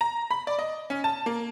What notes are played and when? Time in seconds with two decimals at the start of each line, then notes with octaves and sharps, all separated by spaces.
0.01 A#5
0.31 B5
0.47 D5
0.59 D#5
0.90 C#4
1.04 A5
1.26 A#3